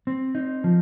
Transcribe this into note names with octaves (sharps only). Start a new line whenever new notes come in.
C4
D#4
F3